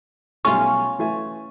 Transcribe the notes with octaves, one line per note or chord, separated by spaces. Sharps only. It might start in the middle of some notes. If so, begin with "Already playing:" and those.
B1 G3 A3 C#4 F4 C#6
E3 A3 G#5